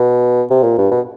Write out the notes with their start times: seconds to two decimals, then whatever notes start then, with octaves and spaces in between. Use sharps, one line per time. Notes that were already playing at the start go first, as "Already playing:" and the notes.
Already playing: B2
0.50 C3
0.64 A#2
0.78 G2
0.91 B2